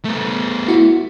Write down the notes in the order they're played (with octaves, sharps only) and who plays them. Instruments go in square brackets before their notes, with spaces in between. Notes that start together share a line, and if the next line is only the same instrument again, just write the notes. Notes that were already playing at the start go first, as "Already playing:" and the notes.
[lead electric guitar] A3 B3
[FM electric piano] E4 F#4